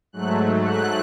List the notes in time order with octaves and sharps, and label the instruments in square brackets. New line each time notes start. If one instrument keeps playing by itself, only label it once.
[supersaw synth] G#2 F#3 A3 F#6
F#6